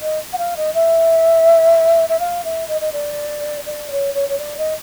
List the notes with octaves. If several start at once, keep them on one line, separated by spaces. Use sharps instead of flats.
D#5
F#5
F5
D#5
E5
E5
F5
E5
D#5
D#5
D5
D5
C#5
C#5
C#5
D5
D#5